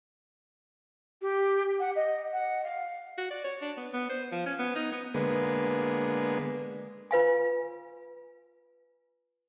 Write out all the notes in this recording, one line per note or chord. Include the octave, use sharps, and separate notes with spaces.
G4
F#5
D#5
F#5
F5
F#4
D5
C#5
D4
B3
B3
C5
F3
C#4
B3
D#4
B3
D3 G#3 A#3 B3
F4 B4 F5 G#5